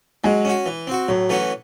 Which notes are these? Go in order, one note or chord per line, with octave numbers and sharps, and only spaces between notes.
F#3 G#3
C#4 F#4
E3
C4 F#4
A2 F#3
E3 A3 C#4 F#4